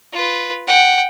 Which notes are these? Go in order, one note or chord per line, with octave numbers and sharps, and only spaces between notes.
F4 B4
F#5 G5